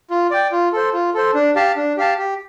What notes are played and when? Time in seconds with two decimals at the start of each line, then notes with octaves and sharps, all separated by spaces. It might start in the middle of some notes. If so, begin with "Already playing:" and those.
0.10 F4
0.31 D5 G5
0.52 F4
0.73 A4 C5
0.93 F4
1.14 A4 C5
1.34 D4
1.55 G4 F5 A5
1.76 D4
1.97 G4 F5 A5
2.18 G4